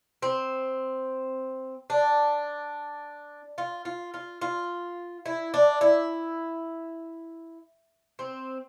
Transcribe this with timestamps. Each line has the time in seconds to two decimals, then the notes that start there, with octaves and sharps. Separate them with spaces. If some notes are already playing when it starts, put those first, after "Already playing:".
0.22 C4
1.90 D4
3.58 F4
3.85 F4
4.14 F4
4.42 F4
5.26 E4
5.54 D4
5.81 E4
8.19 C4